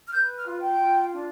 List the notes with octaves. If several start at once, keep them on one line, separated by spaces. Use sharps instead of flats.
F6
B4 G6
F6
F4
G5
F4
D4